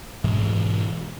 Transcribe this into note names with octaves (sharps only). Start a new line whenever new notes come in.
G#2 B2 E3 G#3